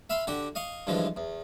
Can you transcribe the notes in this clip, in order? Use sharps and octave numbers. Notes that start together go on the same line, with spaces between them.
E5 F5 B5 C6
D3 F#4 G4 D6
D#5 F5 C#6
G2 D3 E3 F3 G#3
E2